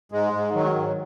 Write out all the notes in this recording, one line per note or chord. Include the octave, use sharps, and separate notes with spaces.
G#2 G#3
G#2
D#3 F#3
G#2